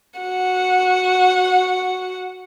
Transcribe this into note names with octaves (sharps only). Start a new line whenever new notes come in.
F#4 F#5